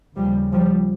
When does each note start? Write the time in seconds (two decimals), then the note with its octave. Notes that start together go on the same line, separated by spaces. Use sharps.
0.16 D#2 C#3 F3 G3
0.53 F3 G3